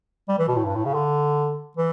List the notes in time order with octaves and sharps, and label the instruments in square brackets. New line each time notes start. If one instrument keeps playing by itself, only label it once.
[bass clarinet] G3
E3
B2
A2
G2
A2
C#3
D3
E3